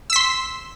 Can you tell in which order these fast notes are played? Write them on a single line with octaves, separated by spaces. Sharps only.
E6 B6 C6